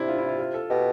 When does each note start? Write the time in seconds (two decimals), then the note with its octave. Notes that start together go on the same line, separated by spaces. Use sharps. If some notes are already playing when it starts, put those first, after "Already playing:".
Already playing: C3 D4 E4
0.08 F4
0.18 E4
0.29 F4
0.39 F4
0.54 A4
0.70 B2 G4